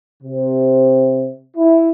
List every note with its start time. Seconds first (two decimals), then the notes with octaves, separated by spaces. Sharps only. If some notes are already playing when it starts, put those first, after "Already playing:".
0.23 C3
1.57 E4